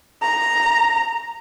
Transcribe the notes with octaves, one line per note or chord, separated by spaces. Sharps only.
A#5